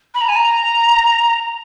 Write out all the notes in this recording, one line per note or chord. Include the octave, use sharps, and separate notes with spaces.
B5
A#5
G#5
A#5